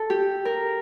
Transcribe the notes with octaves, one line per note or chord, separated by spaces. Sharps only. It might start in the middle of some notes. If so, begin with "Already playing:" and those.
Already playing: A4
G4
A#4